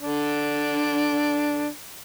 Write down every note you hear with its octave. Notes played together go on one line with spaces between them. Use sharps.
D3 D4